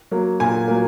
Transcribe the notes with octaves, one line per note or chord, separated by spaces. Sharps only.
F#3 A#3
A#2 G#5
F#3 A#3